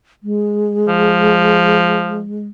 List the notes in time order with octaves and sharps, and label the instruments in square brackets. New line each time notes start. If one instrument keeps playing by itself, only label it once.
[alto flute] G#3
[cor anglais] F3